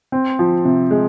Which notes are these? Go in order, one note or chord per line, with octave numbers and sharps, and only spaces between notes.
C4
F3
C3
G#3